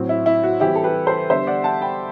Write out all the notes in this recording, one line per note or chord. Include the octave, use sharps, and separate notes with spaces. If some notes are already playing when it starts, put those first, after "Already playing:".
Already playing: A2 F#3 C4
E4
E4
F#4
E3 G3 C4 E4 G4
A4
G4 B4
A4 C5
D3 G3 B3 D4 C5 E5
D5 F#5
F#5 A5
G5 B5